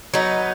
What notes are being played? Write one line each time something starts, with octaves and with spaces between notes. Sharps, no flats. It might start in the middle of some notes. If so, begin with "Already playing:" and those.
F#3 B3 D#4